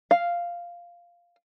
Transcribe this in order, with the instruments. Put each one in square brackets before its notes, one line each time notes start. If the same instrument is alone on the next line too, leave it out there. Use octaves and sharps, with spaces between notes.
[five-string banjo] F5